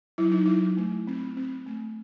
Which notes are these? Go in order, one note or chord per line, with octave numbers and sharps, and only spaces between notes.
F#3 E4
D#4
F#3 E4
A3
C4
C4
A3